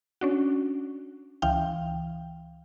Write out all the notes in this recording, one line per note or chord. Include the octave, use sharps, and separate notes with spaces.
C#4 D4 F#4
C#2 E3 F5 G5